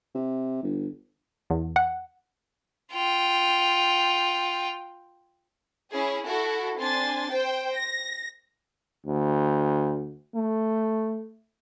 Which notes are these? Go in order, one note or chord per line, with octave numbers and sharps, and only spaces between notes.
C3
G1
E2
F#5
F4 G5
C#4 E4 G#4
E4 F#4 A4
C4 D4 G#5 C6 A6
C5 G5
A#6
D2
A3